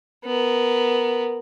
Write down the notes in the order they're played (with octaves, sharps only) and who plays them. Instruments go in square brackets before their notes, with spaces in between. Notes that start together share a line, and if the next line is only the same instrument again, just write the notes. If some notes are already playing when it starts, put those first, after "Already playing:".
[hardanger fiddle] B3 A#4